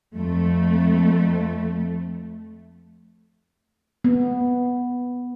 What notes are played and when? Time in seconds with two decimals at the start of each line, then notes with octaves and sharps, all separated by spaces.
0.15 F2 A3
4.04 B3